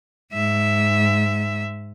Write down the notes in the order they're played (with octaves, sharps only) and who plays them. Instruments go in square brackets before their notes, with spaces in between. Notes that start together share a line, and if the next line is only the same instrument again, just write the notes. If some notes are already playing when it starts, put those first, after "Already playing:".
[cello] G#2 E5